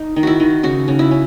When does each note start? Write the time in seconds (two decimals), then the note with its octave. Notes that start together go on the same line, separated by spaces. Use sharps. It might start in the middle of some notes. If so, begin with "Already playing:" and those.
Already playing: D#4
0.16 D#3
0.23 E4 F#4
0.40 D#3
0.63 C#3 F#4
0.88 C#3
0.99 E4
1.11 C#4